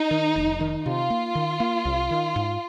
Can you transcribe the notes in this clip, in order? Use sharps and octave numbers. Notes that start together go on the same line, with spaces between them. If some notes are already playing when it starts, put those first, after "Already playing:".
Already playing: D#4
D#3
F1
D#3
C3 F4
A#3
D#3
A#3
C2
D#3
G#2